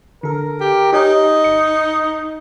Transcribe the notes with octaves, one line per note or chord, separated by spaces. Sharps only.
D3 A4 A#4
G4
D#4 G4 C#5 D#5 G#5
G1 C#7